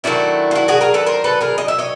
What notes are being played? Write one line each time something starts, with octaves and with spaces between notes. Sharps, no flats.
D#3 F#3 A3 D4 E4 F#4
F4
E4 F#4
F#4 G#4
G#4 A#4
A4 B4
A#4 C5
A4 B4
G#4 A#4
D#5
E5
C#5 D#5